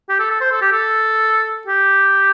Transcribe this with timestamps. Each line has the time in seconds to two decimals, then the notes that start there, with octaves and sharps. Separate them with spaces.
0.09 G4
0.19 A4
0.30 A4
0.41 C5
0.52 A4
0.62 G4
0.72 A4
1.67 G4